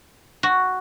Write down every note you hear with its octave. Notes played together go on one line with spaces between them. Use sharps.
F#4